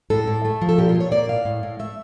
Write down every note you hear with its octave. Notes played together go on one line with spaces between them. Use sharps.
A2 A4
A2
A3
F3
A4
A#2 G4
F4
A#2
C#5
A#3 D5
A2 F5
A2
A2
A3 E5